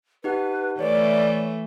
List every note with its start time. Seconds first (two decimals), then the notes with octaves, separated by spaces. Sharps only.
0.24 D#4 G4 B4 F#5
0.79 E3 A3 B4 C#5 D5